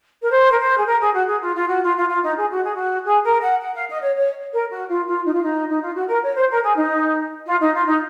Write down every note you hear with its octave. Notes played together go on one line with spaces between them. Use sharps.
A#4
C5
A#4
C5
G#4
A#4
G#4
F#4
G#4
F4
F4
F#4
F4
F4
F4
D#4
G#4
F#4
G#4
F#4
G#4
A#4
F#5
F#5
F5
D#5
C#5
C#5
A#4
F#4
F4
F4
D#4
F4
D#4
D#4
F4
F#4
A#4
C#5
C5
A#4
G#4
D#4
F4
D#4
F4
D#4